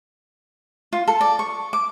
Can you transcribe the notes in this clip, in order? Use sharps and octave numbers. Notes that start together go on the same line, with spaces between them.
F4
A4
D5
C#6
D6